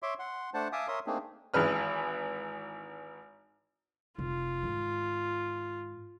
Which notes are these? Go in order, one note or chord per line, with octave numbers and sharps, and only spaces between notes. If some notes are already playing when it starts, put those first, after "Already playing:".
C#5 E5 C6 D6
F#5 C6
A3 D4 C5 F#5 A5
E5 F5 G#5 A5 D6 D#6
A#4 C#5 E5 C6 D#6
A3 A#3 C4 D4 D#4 G#4
G#1 E3 G#4 B4 F6
F1 F4
G#2 D#3